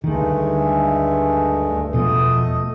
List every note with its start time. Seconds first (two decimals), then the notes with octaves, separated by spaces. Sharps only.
0.04 D2 G2 D#3 G#3 A3
1.93 E1 B2 F3 A3 D#5